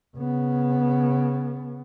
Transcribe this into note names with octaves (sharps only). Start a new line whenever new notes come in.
C#3 B3